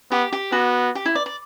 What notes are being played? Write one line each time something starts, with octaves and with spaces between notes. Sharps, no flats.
B3 G4
G4
B3 F#4
G4
E4
D5
D5